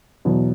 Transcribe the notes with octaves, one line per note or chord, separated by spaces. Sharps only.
E2 B2 F#3